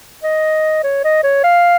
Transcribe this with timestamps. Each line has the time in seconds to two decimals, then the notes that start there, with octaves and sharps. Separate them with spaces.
0.23 D#5
0.83 C#5
1.04 D#5
1.24 C#5
1.44 F5